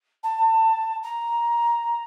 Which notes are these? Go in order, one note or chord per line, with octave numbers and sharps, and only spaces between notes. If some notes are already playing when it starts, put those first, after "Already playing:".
A5
A#5